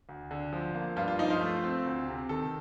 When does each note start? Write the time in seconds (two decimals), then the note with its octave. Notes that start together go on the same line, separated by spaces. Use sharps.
0.09 D2
0.31 D3
0.53 F3
0.75 A#3
0.96 G2 F4
1.08 F4
1.19 F3 D#4
1.30 F4
1.41 A3
1.64 C4
1.86 D2
2.08 C3
2.29 D#3 A4